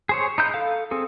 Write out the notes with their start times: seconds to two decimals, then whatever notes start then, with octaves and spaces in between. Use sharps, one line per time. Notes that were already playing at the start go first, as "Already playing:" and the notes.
0.09 G#4 C5 C#5
0.38 D#4 E4 G6
0.54 A4 F5
0.91 C4 G#4 A4